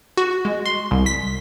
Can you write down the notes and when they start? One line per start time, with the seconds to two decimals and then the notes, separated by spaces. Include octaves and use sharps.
0.17 F#4
0.45 G#3
0.66 C6
0.91 C2
1.06 B6